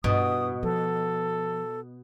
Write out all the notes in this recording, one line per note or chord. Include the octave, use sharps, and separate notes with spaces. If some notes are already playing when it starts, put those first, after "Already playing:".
G2 B2 E4 D#6
F3 A4